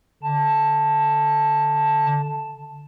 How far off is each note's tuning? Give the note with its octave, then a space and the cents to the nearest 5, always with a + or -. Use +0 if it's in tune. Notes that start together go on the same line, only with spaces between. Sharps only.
D3 -10 A5 +0